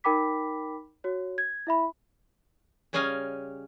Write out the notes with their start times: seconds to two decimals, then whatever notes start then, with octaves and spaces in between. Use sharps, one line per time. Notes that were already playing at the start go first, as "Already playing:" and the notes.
0.04 D#4 A#4 G5 B5 D6 B6
1.04 F#4 C#5
1.38 G#6
1.67 E4 E5 B5
2.93 C#3 G3 C#4 D#5 F5 G#5